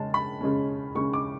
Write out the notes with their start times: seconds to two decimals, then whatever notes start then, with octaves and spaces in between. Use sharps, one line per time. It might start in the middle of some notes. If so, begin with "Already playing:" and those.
Already playing: C#3 G#3 C#4 A5
0.14 B5
0.41 C#3 G#3 C#4
0.95 C#3 G#3 C#4 C#6
1.13 D6